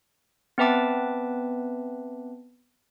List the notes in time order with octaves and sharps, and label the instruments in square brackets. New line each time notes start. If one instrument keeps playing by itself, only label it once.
[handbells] B3 C4 B4 E5 A5 D6